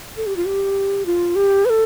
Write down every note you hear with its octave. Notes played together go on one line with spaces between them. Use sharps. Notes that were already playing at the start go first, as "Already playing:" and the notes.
A4
G4
F4
G4
F4
G4
B4
A4